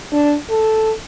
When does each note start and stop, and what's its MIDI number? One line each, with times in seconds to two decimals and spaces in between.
0.12 0.36 62
0.49 0.91 69